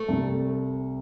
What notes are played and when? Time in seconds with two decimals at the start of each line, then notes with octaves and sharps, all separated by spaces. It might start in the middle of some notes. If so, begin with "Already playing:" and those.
Already playing: A3
0.08 C2 C3 G3